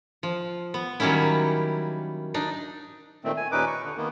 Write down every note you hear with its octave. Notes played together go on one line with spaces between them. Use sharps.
F3
B3
D#3 F#3 G3 A#3 C#4 E4
D4 D#4
A#2 D#3 A3 C4
G#5
D#2 A#2 C#4 D#4 B4 D6
C#6
D3
D#3 A#3 B3